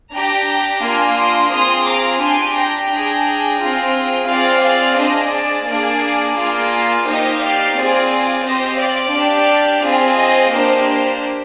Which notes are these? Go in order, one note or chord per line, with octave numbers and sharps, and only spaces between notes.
D4 G4 G5 A#5
A#3 D4 F4 G#5 C6
C6 D#6
C4 F4 G#4 C6 D#6
A#5 D6
D4 G4 G#5 C6
G5 A#5
D4
G#4
C4 F4 G#4
C4 F4 G#4 D5 F5
D5 F5
D4 G#4 C5 D#5
D5
A#3 D4 G#4
A#3 F4 G#4
A#3 D#4 G4 C5 D#5
D5 F5
C4 F4 G#4 D5
C4 G4 C5 D#5
D5 F5
D4 G4
C4 F4 G#4
C5 D#5
A#3 D4 G4 C5
C5